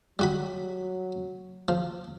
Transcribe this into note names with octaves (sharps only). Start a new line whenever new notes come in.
F#3 G3 F#4 B5
F3